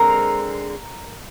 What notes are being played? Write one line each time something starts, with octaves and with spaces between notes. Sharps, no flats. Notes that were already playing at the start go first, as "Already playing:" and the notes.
Already playing: D3 G#3 C4 A#4 A#5